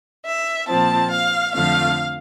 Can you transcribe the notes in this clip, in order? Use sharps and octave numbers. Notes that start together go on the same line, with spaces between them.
E5
A#2 F3 C4 A5
F5
F2 D3 F3 A3 F5